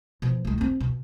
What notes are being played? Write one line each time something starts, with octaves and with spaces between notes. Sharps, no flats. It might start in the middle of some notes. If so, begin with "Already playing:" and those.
B2 F3
D#3 G#3
A#3 C4
B2